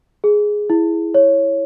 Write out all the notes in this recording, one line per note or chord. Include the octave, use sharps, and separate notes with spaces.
G#4
E4
C#5